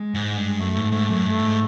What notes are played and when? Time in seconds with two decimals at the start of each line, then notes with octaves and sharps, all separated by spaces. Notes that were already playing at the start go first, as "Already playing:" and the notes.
Already playing: G#3
0.14 G#2
0.37 G2
0.59 F#2 A3
0.76 G#2
0.92 G#2
1.10 F#2
1.26 G2 A3
1.42 G#2